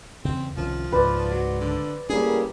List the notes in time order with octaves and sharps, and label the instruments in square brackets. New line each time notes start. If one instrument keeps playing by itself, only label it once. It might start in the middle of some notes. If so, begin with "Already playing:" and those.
[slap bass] E2 C#3 [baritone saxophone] C4
[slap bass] C2 D#3 C#4 [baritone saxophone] F3
[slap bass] C#2 G#2 [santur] B4 C5 D5
[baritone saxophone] F#3
D3
[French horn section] A2 G3 A#3 [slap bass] C#4 [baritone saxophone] G#4